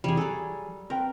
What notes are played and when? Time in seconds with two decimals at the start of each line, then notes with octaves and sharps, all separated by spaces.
0.04 E2 C3 E3 G3 G#4
0.17 F#3 G3 G#4 A4
0.90 C4 A#4 B4 G5